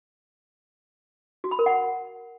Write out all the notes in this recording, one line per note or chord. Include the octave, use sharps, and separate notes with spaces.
F#4
B5
A#4
F#5